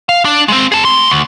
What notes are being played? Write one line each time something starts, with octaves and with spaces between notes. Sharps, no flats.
F5
D4
G#3 C4
G#4 A5
A3 C6
D2